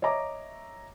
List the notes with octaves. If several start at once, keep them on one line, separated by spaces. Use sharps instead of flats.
C#5 D#5 E5 A#5 D6